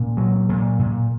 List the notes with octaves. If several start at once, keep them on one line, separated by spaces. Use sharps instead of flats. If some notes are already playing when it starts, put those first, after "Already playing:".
Already playing: A#2 C#4
F#3
A#2
A#2